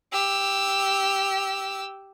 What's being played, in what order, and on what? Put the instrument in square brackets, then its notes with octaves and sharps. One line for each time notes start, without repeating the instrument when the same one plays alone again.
[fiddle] G4 E6